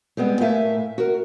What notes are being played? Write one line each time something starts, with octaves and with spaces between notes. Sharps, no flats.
G3 G#3 B3 C4
A2 A3 A#4 E5 F5 G#5
F#4 A#4